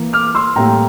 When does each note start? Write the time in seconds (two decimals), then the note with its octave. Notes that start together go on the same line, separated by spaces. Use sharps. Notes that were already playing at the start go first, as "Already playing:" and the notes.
Already playing: E3 A#3
0.13 D6 F6
0.35 C6 E6
0.56 A2 G3 A#3 G5 A#5